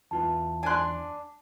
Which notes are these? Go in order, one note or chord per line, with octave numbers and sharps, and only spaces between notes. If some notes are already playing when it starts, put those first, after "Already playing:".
E2 F4 B4 A5
D4 G#5 C6 F#6